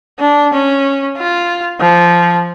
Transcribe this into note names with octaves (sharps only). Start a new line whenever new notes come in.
D4
C#4
F4
F3